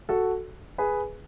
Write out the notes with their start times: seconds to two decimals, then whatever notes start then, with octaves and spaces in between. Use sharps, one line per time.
0.09 F#4 A4
0.78 G#4 B4